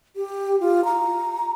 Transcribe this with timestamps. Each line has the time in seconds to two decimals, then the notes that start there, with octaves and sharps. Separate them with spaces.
0.16 G4
0.60 F4
0.85 A#5